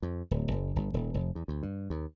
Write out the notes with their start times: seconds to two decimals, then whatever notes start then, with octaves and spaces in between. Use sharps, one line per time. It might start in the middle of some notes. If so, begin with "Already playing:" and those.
0.02 F2
0.31 D1
0.51 F#1
0.76 G1
0.94 D#1
1.14 F1
1.35 E2
1.48 D2
1.63 G2
1.90 D#2